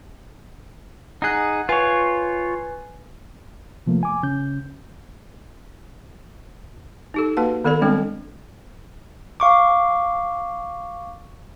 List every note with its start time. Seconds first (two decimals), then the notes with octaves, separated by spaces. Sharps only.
1.22 D#4 G#4 F#5 F#6
1.69 F4 B4 C#5 G#5
3.87 C3 F3 A3 A#3
4.03 G#5 D6
4.23 C#3 C#4 G6
7.14 D#4 G4 A4
7.37 A#3 F#4 B4 F#5 A5
7.64 D#3 B3 A4 D5 B5
7.82 G3 G#3 C4 D4 A4 G5
9.40 F5 C#6 D6